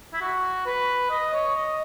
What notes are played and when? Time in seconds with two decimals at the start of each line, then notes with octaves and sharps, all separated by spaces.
0.13 E4
0.21 F#4
0.65 B4
1.10 D#5
1.33 C#5
1.55 D#5